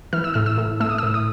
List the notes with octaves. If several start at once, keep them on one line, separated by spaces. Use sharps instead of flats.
E3 F6
E6
A2 F6
E6
A2
A3 E6
D#6
A2 E6
D#6